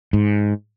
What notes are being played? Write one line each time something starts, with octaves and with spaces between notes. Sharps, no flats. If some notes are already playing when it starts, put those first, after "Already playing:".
G#2